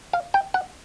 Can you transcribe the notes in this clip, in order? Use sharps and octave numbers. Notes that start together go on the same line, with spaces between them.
F5
G5
F#5